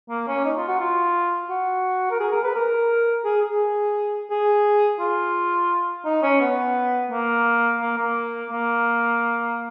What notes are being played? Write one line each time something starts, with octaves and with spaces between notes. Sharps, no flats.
A#3
C#4
D#4
F4
F#4
F4
F#4
A#4
G#4
A#4
B4
A#4
G#4
G#4
G#4
F4
D#4
C#4
B3
A#3
A#3
A#3
A#3